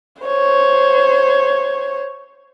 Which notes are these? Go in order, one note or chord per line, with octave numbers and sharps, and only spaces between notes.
C5 C#5